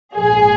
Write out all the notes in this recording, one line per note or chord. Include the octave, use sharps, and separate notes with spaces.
A#1 G#2 F3 G#4